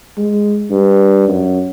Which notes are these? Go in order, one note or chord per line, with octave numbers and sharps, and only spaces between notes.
G#3
G2
F#2